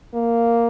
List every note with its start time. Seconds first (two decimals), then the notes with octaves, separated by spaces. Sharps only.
0.14 A#3